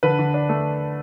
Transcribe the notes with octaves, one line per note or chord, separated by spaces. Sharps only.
D3 B4
D3
D4
A3